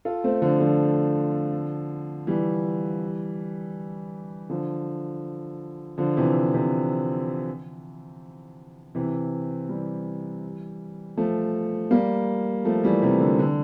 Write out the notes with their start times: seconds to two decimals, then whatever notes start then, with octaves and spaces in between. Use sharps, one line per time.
0.05 F4 A4
0.24 A3 C4
0.42 D3 F3
0.60 D3 F3
2.27 E3 G3
4.50 D3 F3
5.98 D3 F3
6.17 C3 E3
6.54 C3
8.95 C3 E3
9.69 E3 G3
11.17 F3 A3
11.91 G3 A#3
12.65 F3 A3
12.83 E3 G3
13.02 C3 E3
13.20 D3
13.39 D3